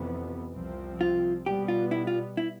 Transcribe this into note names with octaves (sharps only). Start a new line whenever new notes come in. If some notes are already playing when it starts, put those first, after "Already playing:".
Already playing: F2 C3 E3 B3
C2 C3 F3 C4
F4
B2 G3 B3 G4
F4
E4
F4
E4